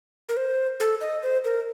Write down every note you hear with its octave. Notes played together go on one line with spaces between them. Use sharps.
A#4
C5
A4
D#5
C5
A#4